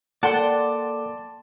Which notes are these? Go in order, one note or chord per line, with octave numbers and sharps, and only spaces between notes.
A#3 A4 D5 F#5 G5 A5 C6